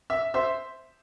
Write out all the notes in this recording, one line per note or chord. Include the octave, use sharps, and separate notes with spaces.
E5
C5 E5